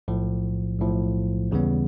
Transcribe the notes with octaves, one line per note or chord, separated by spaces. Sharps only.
B1 A2 F3
B1 A2 F3
D#2 C#3 E3 G3 B3